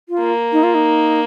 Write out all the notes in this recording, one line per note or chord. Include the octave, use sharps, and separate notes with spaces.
F4
A#3
D#4
F4
D#4